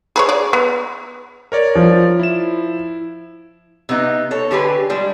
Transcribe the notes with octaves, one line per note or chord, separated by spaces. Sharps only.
G#4 B4 C#5
G#4 D5
B3
A#4 C#5 D5
F3
E4 E7
C3 B3 D#4
A4 C#5
D3 G4 G#4 B4
G3 G#3 D4